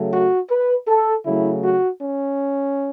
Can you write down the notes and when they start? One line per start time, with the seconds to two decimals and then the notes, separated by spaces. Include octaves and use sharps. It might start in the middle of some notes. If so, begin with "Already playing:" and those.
Already playing: C#3 F#3 A3
0.12 F#4
0.49 B4
0.88 A4
1.24 C#3 F#3 A3 E4
1.62 F#4
2.00 C#4